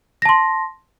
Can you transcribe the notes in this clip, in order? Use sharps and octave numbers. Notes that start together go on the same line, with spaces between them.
A5 C6 A#6